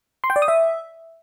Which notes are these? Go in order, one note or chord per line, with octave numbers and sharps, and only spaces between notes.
C6
G5
D5
D#6
E5